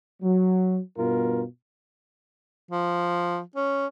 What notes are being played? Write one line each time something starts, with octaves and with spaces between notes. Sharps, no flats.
F#3
G2 B2 F4 A#4
F3
C#4